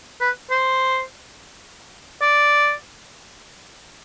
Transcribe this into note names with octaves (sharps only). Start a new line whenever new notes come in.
B4
C5
D5